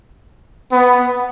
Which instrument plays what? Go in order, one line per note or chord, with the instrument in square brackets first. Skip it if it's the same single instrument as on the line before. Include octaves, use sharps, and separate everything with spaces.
[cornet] B3